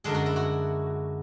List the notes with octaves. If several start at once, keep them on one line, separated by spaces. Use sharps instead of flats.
F#2 D3 G#3 D4 G#4
F#4
E4
F#4